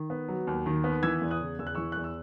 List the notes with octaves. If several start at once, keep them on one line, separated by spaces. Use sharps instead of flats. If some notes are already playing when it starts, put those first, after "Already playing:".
Already playing: D#3
B3
F#3
D#2
D#3
B3
E3 E6 G#6
E2
D#6 F#6
C#3
E2 E6
F#6
E3 C#6 E6
E2 F#6
E6